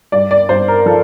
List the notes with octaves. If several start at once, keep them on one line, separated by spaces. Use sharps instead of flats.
G2 D5
D5
G2 C5
A#4
F3 A4